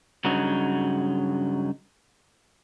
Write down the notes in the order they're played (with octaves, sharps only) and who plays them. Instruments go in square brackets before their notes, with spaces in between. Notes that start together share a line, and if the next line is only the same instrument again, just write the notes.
[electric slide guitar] G2 C#3 F#3 D#4 F#4